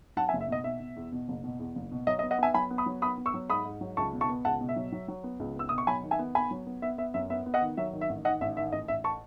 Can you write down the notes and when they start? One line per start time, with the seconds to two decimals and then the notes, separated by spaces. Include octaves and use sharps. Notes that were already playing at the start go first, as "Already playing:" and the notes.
0.17 F#3 F#5 A5
0.29 E5 G#5
0.33 F#1
0.41 E5
0.48 B2 D#5
0.64 B2 E5
0.80 B2
0.96 E2
1.12 B2
1.28 F#1
1.44 B2
1.59 E2
1.75 F#1
1.91 B2
2.07 F#3 D#5
2.19 D#5
2.23 B3
2.31 D#5 F#5
2.38 B3 E5 G#5
2.54 F#3 G#5 B5
2.71 B3
2.78 B5 D#6
2.86 F#3
3.02 B3 B5 D#6
3.18 B3
3.26 C#6 E6
3.34 F#3
3.50 G#2 B5 D#6
3.65 G#2
3.81 F#3
3.97 C#2 A5 C#6
4.13 B2
4.21 A5 C#6
4.29 B3
4.45 C#2 F#5 A5
4.61 B2
4.69 E5
4.76 F#3
4.92 F#3
5.08 F#3
5.24 B3
5.40 C#2
5.55 B3 E6
5.69 B2 D#6
5.78 C#6
5.87 F#3 G#5 B5
6.03 D#3
6.11 E5 G#5
6.19 B3
6.35 B3 G#5 B5
6.51 F#3
6.66 B3
6.82 B3 E5
6.98 B3 E5
7.14 F#2 E5
7.30 B3 E5
7.46 B3
7.54 D#5 F#5
7.62 D#3
7.77 F#3 E5
7.93 D#3
8.01 E5
8.09 A1
8.25 D#3 D#5 F#5
8.41 A1 E5
8.57 D#3 E5
8.72 A1 D#5
8.88 A1 E5
9.04 A5 C#6